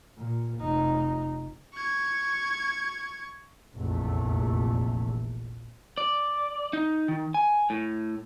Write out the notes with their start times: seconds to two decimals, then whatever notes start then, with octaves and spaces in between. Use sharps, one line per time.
0.18 A#2
0.59 F1 D#4
1.74 C#6 G#6
3.76 F1 A#1 E2 A3
5.98 D5
6.73 D#4
7.08 D#3
7.34 G#5
7.70 A2